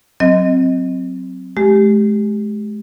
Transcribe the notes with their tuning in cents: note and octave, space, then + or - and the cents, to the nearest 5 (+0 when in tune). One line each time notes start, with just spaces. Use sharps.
F#3 +0 C4 +0 D#5 +5
G#3 +35 G4 +0